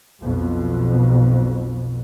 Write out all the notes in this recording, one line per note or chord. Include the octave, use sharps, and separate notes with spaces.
B1 F2 B2